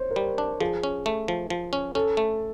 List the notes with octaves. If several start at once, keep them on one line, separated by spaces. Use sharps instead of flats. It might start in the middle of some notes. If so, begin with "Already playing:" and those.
Already playing: C5 C#5
A#4
G3
D4
F3 G#4
C#4
A3
F3
F3
C#4
C#4 A4
A3